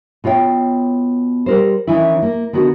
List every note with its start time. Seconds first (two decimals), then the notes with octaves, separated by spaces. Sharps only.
0.24 B2 F4 C#5 E5 G5
1.46 G3 A#4 C5
1.87 D#3 E3 C#4 E4
2.22 A#3
2.53 D3 D#3 B3 F#4